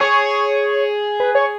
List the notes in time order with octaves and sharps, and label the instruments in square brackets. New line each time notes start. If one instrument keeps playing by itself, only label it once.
[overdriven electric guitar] G#4 [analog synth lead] C#5
[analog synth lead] B4
C#5